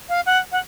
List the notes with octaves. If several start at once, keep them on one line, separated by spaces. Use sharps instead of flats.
F5
F#5
F#5